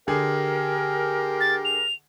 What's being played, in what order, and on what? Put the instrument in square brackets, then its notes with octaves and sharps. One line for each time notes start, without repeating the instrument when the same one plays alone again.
[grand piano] D3 G#4 [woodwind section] G4 A#4
[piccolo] A6
F7